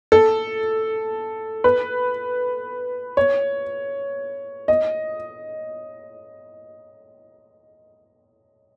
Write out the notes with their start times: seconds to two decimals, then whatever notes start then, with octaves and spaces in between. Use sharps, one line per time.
0.12 A4
1.64 B4
3.17 C#5
4.68 D#5